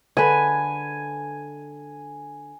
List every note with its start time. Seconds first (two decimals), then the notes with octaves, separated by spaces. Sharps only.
0.17 D3 B4 G#5